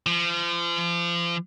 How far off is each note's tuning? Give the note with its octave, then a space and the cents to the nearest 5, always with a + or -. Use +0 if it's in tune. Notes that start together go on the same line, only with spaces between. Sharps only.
F3 -30